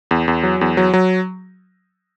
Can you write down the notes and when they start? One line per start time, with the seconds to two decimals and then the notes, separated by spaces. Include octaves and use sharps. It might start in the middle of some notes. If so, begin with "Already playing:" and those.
0.11 E2
0.28 E2
0.43 F#3
0.61 E2
0.77 F#3
0.93 F#3